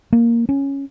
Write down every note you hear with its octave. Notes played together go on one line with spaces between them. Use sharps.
A#3
C#4